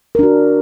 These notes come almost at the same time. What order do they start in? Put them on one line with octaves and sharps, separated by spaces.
A#4 D4 F#4